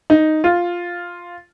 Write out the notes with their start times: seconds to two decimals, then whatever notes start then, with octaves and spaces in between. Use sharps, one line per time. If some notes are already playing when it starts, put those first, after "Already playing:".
0.10 D#4
0.44 F4